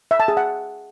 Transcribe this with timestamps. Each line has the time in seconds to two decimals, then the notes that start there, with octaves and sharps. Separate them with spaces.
0.11 E5
0.20 A5
0.28 G#4
0.37 F#5